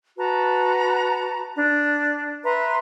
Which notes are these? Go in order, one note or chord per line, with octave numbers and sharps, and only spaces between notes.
F#4 B4 A5 A#5
D4
B4 E5 A#5 C6